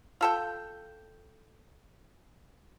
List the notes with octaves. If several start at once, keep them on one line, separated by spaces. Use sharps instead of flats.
F4 A4 G5